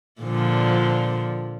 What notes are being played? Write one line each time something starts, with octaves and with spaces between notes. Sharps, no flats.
A#2 D3 F3